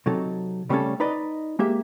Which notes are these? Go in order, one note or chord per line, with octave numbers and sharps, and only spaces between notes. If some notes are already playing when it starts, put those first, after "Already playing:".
C3 F#3 D#4 A4
C#3 G3 A3 C4 C#4 A4
D#4 B4 D5 D#5
G#3 A#3 G4 E5